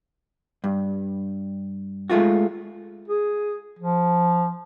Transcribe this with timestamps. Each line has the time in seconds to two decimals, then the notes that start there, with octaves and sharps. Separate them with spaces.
0.64 G2
2.10 G#3 A3 F4 F#4
3.08 G#4
3.79 F3